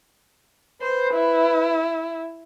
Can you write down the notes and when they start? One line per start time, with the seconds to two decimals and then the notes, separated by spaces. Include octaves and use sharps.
0.82 B4 C5
1.14 E4